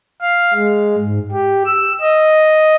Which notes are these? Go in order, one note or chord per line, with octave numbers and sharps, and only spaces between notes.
F5
G#3
G#2
G4
E6
D#5